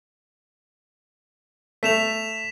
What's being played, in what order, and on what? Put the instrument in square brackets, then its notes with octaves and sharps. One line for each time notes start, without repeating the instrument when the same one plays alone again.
[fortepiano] A3 [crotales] B6 E7 F7